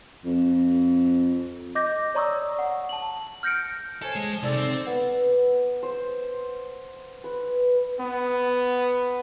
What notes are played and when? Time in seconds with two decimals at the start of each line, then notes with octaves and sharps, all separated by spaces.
0.25 F2
1.75 D#5 D6 G6 A#6
2.15 C#5 D5 A#5 C#6 D#6 E6
2.59 F#5
2.89 A5 F#7
3.43 F6 G6 A#6 C#7 D7
4.02 A4 C5 C#5 G#5
4.15 G#3
4.31 F3
4.42 C2 C3 D#4 A4 D5
4.57 C4
4.86 B3
5.83 C5
7.24 B4
8.00 B3